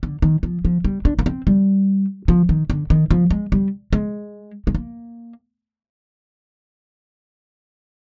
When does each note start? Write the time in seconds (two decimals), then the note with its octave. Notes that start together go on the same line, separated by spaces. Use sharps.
0.03 D3
0.22 D#3
0.43 F3
0.65 F3
0.84 G3
1.05 D4
1.19 A#3
1.26 C4
1.47 G3
2.28 F3
2.49 D#3
2.70 D3
2.90 D#3
3.11 F3
3.31 G#3
3.52 G3
3.93 G#3
4.67 G#3
4.75 A#3